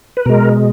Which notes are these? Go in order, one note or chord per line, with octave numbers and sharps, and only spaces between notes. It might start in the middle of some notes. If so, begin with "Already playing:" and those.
B4
B2 G#3 A#4